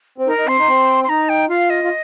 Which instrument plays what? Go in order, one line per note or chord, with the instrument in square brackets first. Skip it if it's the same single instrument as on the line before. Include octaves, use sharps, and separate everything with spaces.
[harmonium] C4
[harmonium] D#4 [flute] A#4
[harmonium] D#4
[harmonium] C4 [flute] C6
[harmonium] D#4
C4
[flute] C6
[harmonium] D#4 [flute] A#5
[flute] G5
[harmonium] F4 [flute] F5
[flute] D#5
[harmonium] F4